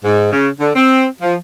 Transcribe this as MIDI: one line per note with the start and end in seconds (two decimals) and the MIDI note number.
0.04 0.30 44
0.31 0.48 49
0.60 0.71 50
0.75 1.06 60
1.21 1.35 53